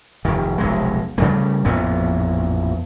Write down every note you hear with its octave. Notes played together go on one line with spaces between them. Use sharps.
F1 D#3
F1 B1 G#3
C#3 G3 A3
A1 F2 A#2 B3